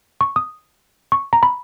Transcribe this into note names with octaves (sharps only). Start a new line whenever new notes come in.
C#6
D#6
C#6
A#5
B5